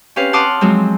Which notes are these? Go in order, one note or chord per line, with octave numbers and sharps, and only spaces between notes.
C4 C#4 G4 B4 F5
F#5 A5 C6 D6 D#6 F6
F3 F#3 G#3 C4